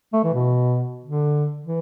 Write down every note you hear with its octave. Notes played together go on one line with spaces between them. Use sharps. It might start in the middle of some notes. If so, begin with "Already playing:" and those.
A3
E3
B2
D3
E3